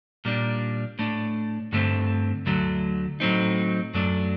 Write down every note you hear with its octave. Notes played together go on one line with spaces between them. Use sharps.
A#2 G3 D4
A2 A3 D4
G2 D3 A3 C4
D2 D3 F#3 A3
A2 F#3 A3 C4 D#4
F#2 F#3 A3 D4